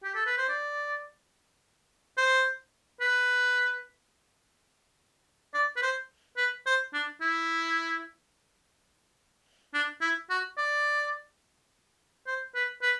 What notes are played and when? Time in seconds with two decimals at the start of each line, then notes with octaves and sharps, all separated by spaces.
0.03 G4
0.15 A4
0.26 B4
0.38 C5
0.49 D5
2.17 C5
3.01 B4
5.54 D5
5.76 B4
5.82 C5
6.37 B4
6.66 C5
6.93 D4
7.21 E4
9.74 D4
10.01 E4
10.30 F#4
10.57 D5
12.27 C5
12.55 B4
12.82 B4